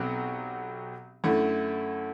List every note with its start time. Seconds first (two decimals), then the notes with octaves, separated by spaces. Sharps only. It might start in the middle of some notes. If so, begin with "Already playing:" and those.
Already playing: B1 B2 F#3 C4 G4
1.24 F#2 D3 A3 E4